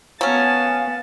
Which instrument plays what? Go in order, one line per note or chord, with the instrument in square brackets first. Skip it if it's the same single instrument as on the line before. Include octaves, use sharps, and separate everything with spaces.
[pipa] F#3 C#4 [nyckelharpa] B3 A5 [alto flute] F5 [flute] G#5